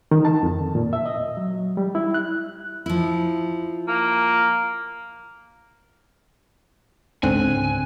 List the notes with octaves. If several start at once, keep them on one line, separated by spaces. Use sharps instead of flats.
D#3
A5
F2
A#2
E5
D#5
F#3
G3
E4
F#6
F3 E4
A#3
C#2 G#2 D3 C4 C#4 G#5 F#6